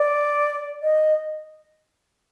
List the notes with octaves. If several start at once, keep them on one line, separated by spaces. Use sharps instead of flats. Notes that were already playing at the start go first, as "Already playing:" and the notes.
Already playing: D5
D#5